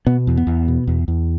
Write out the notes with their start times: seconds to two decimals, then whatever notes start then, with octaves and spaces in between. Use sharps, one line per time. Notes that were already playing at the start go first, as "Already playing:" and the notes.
0.06 B2 B3
0.27 E2
0.37 B3
0.47 E2
0.68 B2
0.87 E2
1.08 E2